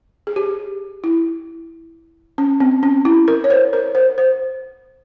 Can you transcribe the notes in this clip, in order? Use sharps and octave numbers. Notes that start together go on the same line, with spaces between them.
G#4
G4
E4
C#4
C4
C#4
E4
A#4
C#5
C5
A#4
C5
C5